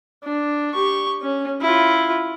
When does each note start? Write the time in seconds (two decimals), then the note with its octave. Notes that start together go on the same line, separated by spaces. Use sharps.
0.24 D4
0.73 G4 C#6
1.22 C#4
1.61 E4 F4